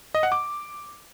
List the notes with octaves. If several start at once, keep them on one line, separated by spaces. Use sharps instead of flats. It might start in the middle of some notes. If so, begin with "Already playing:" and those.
D#5
F#5
D6